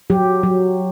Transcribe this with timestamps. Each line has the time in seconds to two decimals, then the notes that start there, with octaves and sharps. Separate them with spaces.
0.10 F#3 G4
0.43 F#3